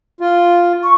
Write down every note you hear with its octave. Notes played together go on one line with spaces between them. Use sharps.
F4
C#6